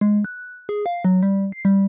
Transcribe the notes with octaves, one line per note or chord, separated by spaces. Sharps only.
G#3
F#6
G#4
F5
F#3
G3
C7
G3